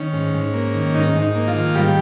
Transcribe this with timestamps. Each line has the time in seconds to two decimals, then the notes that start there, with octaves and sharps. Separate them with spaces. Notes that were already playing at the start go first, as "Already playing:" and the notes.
Already playing: D#3 C#4
0.13 G#2
0.34 G#2
0.53 A#3
0.74 D#3
0.94 G#2 D#4
1.15 G#2
1.22 D#4
1.35 A#3
1.47 F3 F4
1.55 D#3
1.74 G#2 G3 G4